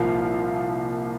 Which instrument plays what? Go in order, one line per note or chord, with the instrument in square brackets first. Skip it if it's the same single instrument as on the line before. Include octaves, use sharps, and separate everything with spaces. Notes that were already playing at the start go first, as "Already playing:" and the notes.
Already playing: [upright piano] C2 A#2 F3 A#3 F5